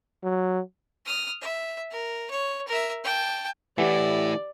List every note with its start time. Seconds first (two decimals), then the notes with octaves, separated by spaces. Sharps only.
0.23 F#3
1.06 D#6 F6
1.41 E5
1.91 A#4
2.30 C#5
2.68 A#4 E5
3.04 G5 A5
3.78 E3 A3 E4 G4 D5 F#5